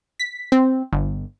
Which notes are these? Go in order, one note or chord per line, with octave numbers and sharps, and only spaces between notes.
B6
C4
G1